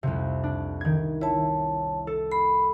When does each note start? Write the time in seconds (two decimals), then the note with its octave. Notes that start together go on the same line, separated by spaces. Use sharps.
0.03 C2 F2 C3
0.44 D4
0.81 D#3 G#6
1.21 E4 C#5 A5
2.07 A4
2.32 B5 C7